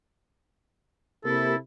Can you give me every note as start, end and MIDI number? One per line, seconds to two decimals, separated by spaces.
1.25 1.57 48
1.25 1.56 58
1.25 1.57 64
1.25 1.56 67
1.25 1.55 69
1.25 1.56 70